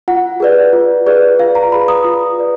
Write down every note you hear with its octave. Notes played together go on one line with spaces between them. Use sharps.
F4 F#5
G#4 B4 D5
F4
G#4 B4 D5
F4 F5
A#5
G#4 B4 D5 B5
D#6
F4
G#4 B4 D5